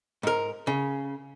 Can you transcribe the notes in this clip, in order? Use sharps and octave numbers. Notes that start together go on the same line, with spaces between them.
G#2 A#4
C#3